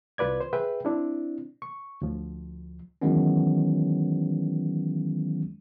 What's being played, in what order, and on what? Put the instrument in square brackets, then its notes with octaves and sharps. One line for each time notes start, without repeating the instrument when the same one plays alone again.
[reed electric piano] C2 F4 B4 D5 G#6
C5
G#4 B4 E5 G5
C4 D4 E4
C#6
D2 F3
[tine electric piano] D#3 E3 F#3 G#3 B3 C#4